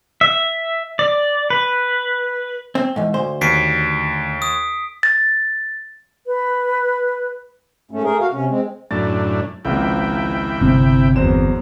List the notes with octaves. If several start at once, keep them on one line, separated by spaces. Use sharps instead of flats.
E5
D5
B4
C4
E2 G#2
D2 C5
D#2 B6 C7 D7
D#6
A6
B4
G#2 A3 C#4
A3 G#4 A#4
F#4 F5
C3 C#4
G#3 C4
F#2 A2 D4 A6
G#1 C#2 F3 A#3 E4 G5
G1 C3 C4
E2 F#3 C5 E7